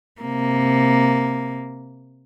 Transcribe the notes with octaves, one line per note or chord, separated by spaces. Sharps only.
C3 A#3